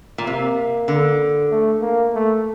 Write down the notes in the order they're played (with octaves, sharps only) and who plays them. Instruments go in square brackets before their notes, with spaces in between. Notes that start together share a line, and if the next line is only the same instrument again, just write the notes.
[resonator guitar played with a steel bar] A#2
[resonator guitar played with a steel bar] C3 [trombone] A#3
[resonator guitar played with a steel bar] D3
[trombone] A3
A#3
A3